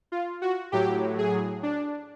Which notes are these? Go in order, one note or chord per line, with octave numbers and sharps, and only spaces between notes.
F4
F#4
A2 F#3 G4
G#4
D4